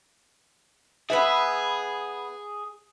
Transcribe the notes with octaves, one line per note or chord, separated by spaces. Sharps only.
B3 G#4 B4 E5